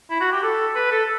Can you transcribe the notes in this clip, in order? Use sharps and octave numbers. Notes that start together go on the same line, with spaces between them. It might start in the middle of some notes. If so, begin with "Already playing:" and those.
E4
F#4
G4
A4
B4
A4